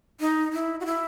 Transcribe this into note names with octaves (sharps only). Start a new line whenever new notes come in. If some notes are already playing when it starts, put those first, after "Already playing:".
D#4
E4
F#4
E4